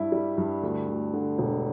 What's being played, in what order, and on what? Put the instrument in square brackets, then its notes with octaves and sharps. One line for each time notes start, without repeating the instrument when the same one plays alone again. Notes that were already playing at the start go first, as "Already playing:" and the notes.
Already playing: [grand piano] G2 E4
G3
G2
D2
D2
D3
E1